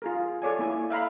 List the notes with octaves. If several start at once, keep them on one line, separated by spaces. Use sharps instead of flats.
F4 G#4 A#4
A4 C#5 D5 G#5
A#3 E4 G#5
E5 F5 A#5 B5